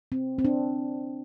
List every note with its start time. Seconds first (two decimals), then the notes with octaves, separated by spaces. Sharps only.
0.12 C4
0.39 C4
0.45 D4